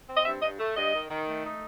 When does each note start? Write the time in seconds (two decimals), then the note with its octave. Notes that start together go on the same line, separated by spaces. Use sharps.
0.08 C4
0.16 D#5
0.25 G2 E5
0.42 G2 D#5
0.59 A3
0.76 G2 D#5
0.94 D#3
1.10 D#3
1.28 A3
1.45 D#4